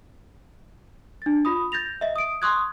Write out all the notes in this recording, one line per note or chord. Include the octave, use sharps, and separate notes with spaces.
D4 A6
F4 B5 D#6
G6 A6 A#6 F7
D#5 E5
D#6 D7
C6 C#6 D#6 F#6 G#6